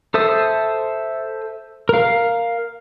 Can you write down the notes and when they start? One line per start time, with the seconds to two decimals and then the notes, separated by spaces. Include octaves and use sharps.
0.14 A4 C5 E5 D#6
1.89 A#4 F5